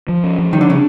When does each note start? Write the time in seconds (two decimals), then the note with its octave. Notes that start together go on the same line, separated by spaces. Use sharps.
0.08 F3
0.24 C#4
0.38 F3
0.53 D#3 G3
0.61 D3
0.68 C#3 D4